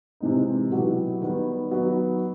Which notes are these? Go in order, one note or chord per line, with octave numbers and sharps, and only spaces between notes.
C3 E3 G#3 C4 D#4
B2 F#3 B3 E4 G4
D#3 G3 B3
F#3 B3 D#4